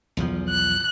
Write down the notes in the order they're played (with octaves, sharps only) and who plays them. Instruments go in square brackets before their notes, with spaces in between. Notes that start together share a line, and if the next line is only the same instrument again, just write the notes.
[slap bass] B1 E2 F3
[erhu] F#6